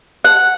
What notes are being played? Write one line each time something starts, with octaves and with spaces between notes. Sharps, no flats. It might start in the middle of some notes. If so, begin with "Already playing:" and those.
F#5